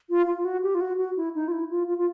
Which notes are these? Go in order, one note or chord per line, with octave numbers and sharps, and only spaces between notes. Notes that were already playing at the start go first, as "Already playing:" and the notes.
F4
F4
F4
F#4
G4
F4
F#4
F#4
E4
D#4
F4
E4
F4
F4
F4